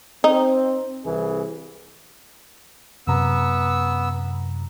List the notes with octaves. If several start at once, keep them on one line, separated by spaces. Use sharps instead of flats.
C4 D#4
C2 E3 G#4
F#2 C3 B3 A#5 E6